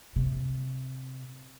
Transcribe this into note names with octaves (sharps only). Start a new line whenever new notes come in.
C3